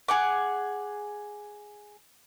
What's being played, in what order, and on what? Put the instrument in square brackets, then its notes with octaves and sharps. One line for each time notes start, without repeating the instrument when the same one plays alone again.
[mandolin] G#4 F#5 D6